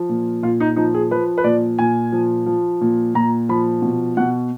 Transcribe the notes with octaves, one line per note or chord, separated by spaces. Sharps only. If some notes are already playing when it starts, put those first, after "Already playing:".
Already playing: F3
A#2
A#2 F4
D#4
F3 D#4
G#4
F3 B4
B4
A#2 D5
A#2 G#5
F3
F3
A#2
A#2 A#5
F3 B5
B2
B2 F#5